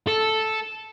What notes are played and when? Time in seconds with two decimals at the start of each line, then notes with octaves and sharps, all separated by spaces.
0.08 A4